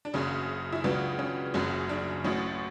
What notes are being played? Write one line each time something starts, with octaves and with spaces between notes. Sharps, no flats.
D4
F#1 F#2 C#3 C#4
E4
C#2 C#3 F#3 B3 D4
C#4
F#1 F#2 C#3 C#4
D4
A1 A2 F#3 C#4